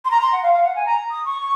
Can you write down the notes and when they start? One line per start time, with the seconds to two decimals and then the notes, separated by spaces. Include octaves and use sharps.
0.05 C6
0.11 A#5
0.21 C6
0.32 F#5
0.43 F5
0.53 F5
0.64 F#5
0.76 G#5
0.86 A#5
1.11 D#6
1.25 C#6